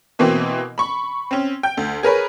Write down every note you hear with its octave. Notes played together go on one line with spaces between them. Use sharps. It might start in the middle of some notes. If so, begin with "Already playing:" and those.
B2 E3 A#3 C4
B5 C#6
C4 C#4
G5 G6
D2
G#4 A#4 B4 C#5